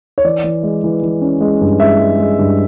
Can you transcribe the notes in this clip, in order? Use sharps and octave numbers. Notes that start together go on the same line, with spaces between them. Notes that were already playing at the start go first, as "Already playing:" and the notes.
C#5
E3 D5
E3
G#3
E3
E3
C#4
G#3
G2
G#3 E5
G#3
G#3
G2